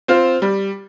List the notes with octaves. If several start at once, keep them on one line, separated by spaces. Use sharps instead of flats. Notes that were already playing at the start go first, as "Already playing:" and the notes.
C4 F4 C5
G3